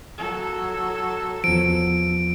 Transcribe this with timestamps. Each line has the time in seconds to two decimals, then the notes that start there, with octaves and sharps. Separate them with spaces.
0.18 F#3 A4
1.44 E2 F3 D7